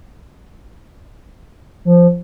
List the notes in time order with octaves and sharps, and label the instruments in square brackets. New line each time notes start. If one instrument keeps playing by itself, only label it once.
[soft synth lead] F3